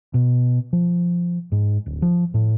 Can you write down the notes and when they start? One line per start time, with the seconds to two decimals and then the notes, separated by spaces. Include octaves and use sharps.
0.14 B2
0.73 F3
1.52 G#2
1.86 D1
2.02 F3
2.34 A2